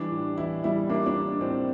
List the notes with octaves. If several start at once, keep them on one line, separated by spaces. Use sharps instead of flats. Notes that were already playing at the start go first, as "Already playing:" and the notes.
Already playing: E3 G3 D4
A2
E3 E4
G3 E4
A#3 D4
D4
A#3
A2 C4